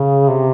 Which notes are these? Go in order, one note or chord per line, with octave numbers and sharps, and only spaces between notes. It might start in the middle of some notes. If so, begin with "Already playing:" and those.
Already playing: C#3
C3